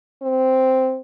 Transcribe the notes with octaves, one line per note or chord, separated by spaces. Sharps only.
C4